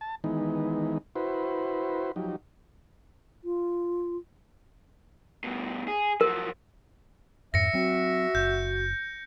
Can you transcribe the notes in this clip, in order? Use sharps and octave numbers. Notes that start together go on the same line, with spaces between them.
A5
D#3 E3 G#3 B3 D#4
E4 F#4 B4 C5
F3 F#3 D#4 G4
F4
G2 B2
G#4
F3 F#3 A#4
F2 G#2 E5 A#6 C#7
F#3 C4 F#4
F#1 G6